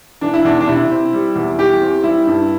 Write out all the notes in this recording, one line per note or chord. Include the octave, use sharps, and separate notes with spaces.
E3 D4
E4
E2 D4
D4
C3 E4
C4
G3
E2
E3 G4
C4
G3 E4
G2